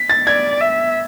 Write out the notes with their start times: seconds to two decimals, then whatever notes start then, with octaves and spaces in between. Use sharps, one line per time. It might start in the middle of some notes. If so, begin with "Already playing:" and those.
Already playing: B6
0.09 A6
0.27 D5 G#6
0.61 E5